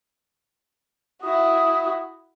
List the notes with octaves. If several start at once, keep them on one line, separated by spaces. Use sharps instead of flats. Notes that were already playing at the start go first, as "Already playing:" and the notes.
E4 F#4 D#6